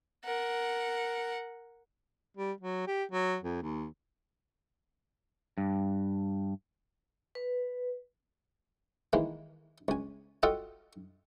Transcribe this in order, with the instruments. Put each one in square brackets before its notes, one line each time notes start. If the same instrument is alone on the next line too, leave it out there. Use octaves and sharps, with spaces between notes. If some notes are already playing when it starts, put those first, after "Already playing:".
[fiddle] A#4 F#5
[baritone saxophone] G3
F#3
G4
F#3
F2
D#2
[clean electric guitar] G2
[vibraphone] B4
[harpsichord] D#3 E3 G#3 A#3
C#2 G#5
F4 F#4 A4 D#5 F#5 G5